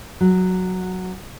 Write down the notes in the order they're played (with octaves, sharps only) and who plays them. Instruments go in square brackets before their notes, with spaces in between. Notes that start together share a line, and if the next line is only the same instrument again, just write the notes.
[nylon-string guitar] F#3